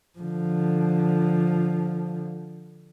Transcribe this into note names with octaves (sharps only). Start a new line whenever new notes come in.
D3 F3